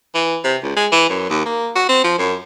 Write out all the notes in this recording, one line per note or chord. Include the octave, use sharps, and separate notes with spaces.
E3
C3
C#2
G#3
E3
F#2
D#2
A#3
F#4
C4
F3
F#2